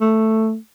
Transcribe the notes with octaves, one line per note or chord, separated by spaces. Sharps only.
A3